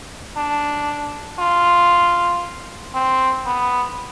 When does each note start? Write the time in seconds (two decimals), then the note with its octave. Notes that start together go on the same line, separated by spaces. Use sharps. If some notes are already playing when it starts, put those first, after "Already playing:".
0.36 D4
1.39 F4
2.94 C4
3.46 B3